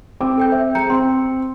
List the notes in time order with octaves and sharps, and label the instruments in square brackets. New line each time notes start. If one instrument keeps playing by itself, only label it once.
[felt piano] C4 D6
[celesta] A4 G5 G6
C5 E5
[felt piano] G#4 [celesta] A#5 G6 C#7
[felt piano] C4 [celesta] C6